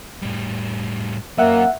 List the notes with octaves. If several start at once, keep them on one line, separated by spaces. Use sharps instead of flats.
A2 G3
F#3 A#3 C#4 E5 F#5